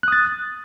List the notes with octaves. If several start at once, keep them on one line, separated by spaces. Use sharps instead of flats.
D#6 F#6 A6